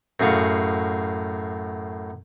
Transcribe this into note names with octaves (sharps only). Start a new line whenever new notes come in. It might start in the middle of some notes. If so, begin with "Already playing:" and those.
F#2 A2 G#4 F5 F#5